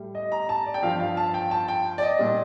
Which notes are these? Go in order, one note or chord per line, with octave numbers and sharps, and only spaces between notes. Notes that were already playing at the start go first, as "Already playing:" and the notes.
Already playing: A2 G3
D#5
A#5
A5
D5
G5
G2 F3 F5
F5
A5
G5
A5
G5
D5
D#5
A#2 G3